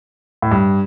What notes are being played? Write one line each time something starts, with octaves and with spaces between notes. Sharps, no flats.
A2
G2